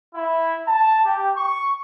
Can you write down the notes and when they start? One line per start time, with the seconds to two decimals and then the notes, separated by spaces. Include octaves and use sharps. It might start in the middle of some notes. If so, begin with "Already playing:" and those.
0.15 E4
0.67 A5
1.04 G4
1.37 C#6